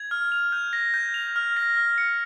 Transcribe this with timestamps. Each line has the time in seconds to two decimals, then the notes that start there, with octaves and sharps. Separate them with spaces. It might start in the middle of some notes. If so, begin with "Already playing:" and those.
Already playing: G#6
0.11 F6
0.32 F7
0.52 G6
0.73 A#6
0.94 G6
1.14 F7
1.36 F6
1.57 A#6
1.77 F6
1.98 C#7